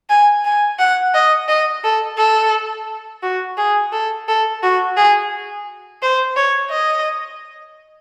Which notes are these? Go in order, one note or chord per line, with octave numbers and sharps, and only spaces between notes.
G#5
G#5
F#5
D#5
D#5
A4
A4
F#4
G#4
A4
A4
F#4
G#4
C5
C#5
D#5